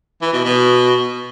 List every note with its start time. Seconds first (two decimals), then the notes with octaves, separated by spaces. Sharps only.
0.22 E3
0.33 B2
0.45 B2